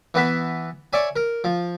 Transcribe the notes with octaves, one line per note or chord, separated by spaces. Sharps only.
E3 B3 B4 E5
C#5 D5 E5 G#5
A#4
F3